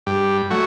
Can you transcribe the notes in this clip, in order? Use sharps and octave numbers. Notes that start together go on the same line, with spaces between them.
G2 G4
F#3 A3 F#4